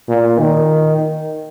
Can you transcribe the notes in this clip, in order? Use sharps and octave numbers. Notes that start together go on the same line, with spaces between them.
A#2
D#3